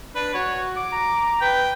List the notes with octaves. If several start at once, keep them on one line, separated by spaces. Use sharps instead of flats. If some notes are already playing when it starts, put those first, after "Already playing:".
D4 B4
F#4 C#5
D6
A#5
B4 G5